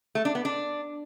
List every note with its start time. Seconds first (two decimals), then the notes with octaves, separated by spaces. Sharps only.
0.15 A3
0.25 D4
0.35 B3
0.45 D4